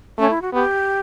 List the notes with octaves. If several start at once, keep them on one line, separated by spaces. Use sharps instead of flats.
A3 C#4
E4
F#4
B3 G4